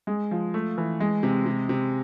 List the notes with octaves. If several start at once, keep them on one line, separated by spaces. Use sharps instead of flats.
G#3
F3
A3
E3
G#3
C3
C3
C3